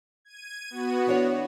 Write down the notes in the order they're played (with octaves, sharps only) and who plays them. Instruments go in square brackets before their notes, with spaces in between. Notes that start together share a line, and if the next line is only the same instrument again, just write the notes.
[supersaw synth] G#6 D#7
B3 F#4
[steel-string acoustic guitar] E3 D4 C#5